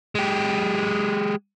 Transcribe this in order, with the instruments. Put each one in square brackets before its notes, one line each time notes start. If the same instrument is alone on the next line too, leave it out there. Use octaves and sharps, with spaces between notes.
[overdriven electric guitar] G#3 G4